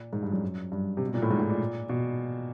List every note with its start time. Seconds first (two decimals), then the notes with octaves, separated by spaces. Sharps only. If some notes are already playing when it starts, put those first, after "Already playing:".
Already playing: A#2
0.13 G#2
0.23 G2
0.32 F#2
0.72 G2
0.97 C3
1.06 B2
1.14 A#2
1.22 A2
1.30 G#2
1.40 A2
1.50 A#2
1.89 B2